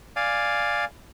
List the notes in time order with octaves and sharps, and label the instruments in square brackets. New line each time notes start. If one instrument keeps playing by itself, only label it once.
[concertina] D5 F5 G#5